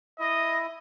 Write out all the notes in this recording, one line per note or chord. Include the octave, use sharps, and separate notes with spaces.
E4 D#5